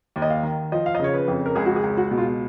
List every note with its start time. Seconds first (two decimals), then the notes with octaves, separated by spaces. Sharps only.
0.16 D#2
0.22 D#5
0.30 F5
0.43 D#3
0.72 F3 D#5
0.86 F5
0.95 D#5
0.99 C#3 C#5
1.14 B4
1.28 F2
1.46 A#4
1.55 C#2 G#4
1.66 F#4
1.76 G#4
1.83 C#2
1.98 F#4
2.11 B2
2.18 F4